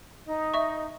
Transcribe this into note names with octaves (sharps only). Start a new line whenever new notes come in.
D#4
D#5 E5 C#6